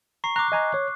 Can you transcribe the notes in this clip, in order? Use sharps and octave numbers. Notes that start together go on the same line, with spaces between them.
A#5 C#6 C7
A#5 D6 F#6
D#5 G#5 A#5
C#5